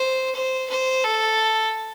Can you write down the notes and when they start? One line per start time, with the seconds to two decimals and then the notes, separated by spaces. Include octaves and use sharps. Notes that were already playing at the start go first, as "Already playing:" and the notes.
Already playing: C5
0.35 C5
0.70 C5
1.04 A4